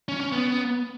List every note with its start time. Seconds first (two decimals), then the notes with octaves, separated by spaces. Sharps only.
0.08 C#4
0.20 C#4
0.32 B3